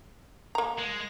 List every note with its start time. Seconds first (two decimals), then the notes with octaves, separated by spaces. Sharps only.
0.55 A#3 A#5
0.78 G#3